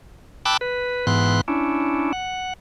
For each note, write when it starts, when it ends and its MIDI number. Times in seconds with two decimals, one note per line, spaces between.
0.45 0.57 79
0.45 0.57 81
0.45 0.57 83
0.45 0.57 86
0.45 0.57 88
0.45 0.57 90
0.61 1.06 71
1.07 1.41 44
1.07 1.41 52
1.07 1.41 59
1.07 1.41 84
1.07 1.41 90
1.48 2.12 61
1.48 2.12 62
1.48 2.12 64
2.13 2.53 78